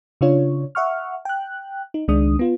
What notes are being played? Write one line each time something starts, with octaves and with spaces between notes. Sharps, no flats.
C#3 D4 F4 C#5
E5 F#5 C#6 F6
G5 F#6
D#4
C#2 D#3 G#3 D4 D#6
B3 F4